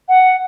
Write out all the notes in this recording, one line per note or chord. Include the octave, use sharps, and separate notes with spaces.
F#5